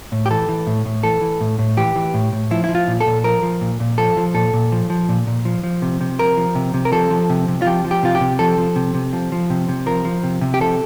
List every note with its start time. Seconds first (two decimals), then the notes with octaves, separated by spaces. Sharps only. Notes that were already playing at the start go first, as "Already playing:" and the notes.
0.12 A2
0.26 G4
0.30 E3 A4
0.49 E3
0.67 A2
0.85 A2
1.03 E3 A4
1.21 E3
1.41 A2
1.59 A2
1.77 E3 G4
1.96 E3
2.14 A2
2.32 A2
2.51 F3 E4
2.64 F3 E4
2.75 F4
2.88 A#2
3.01 A4
3.06 A#2
3.24 F3 A#4
3.43 F3
3.61 A#2
3.80 A#2
3.98 F3 A4
4.17 F3
4.34 A#2 A4
4.53 A#2
4.72 F3
4.90 F3
5.09 A#2
5.27 A#2
5.45 F3
5.64 F3
5.82 C3
6.01 C3
6.19 F3 A#4
6.37 F3
6.55 C3
6.74 C3
6.85 A#4
6.92 F3 A4
7.10 F3
7.30 C3
7.48 C3
7.62 F4
7.66 F3 G4
7.85 F3
7.91 G4
8.03 C3 F4
8.15 G4
8.21 C3
8.39 F3 A4
8.58 F3
8.76 C3
8.94 C3
9.13 F3
9.32 F3
9.50 C3
9.69 C3
9.86 F3 A#4
10.05 F3
10.24 C3
10.41 C3
10.54 G4
10.61 F3 A4